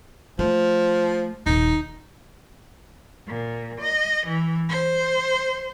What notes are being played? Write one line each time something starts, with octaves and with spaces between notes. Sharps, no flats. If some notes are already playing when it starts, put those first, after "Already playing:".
F3 A3
D#1 D#4
A#2
D#5
E3
C5